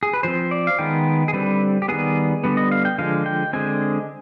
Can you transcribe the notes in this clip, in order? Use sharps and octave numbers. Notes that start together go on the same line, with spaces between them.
G#4
B4
F3 C4 C5
D5
F5
D#3 G#3 B3 G5
G#4
D3 G3 C4 B4
G4
D#3 G3 B3 G#4
D3 G3 B3
D#5
F5
G5
D3 F3 G#3 F5
G5
D3 G#3 C4 G#5